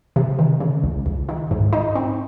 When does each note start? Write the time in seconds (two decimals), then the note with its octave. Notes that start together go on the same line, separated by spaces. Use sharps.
0.16 C3
0.39 D#3
0.60 C#3
0.83 C#2
1.06 C#2
1.29 D#3
1.51 G#2
1.73 D#4
1.95 C4